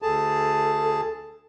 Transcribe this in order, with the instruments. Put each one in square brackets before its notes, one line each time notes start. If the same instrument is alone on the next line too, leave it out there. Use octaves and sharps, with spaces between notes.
[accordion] D2 G#4 A5 [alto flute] A4